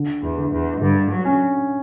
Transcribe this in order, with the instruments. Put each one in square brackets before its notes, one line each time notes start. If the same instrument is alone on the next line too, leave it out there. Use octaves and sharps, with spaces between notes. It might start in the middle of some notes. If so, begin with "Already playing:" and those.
Already playing: [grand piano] D3
[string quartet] E2
[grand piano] D3
[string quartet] E2
[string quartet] G2 [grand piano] D3
[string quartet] F#3
[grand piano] C#4